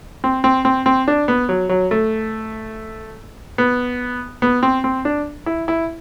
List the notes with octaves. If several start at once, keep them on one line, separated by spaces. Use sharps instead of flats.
C4
C4
C4
C4
D4
B3
F#3
F#3
A3
B3
B3
C4
C4
D4
E4
E4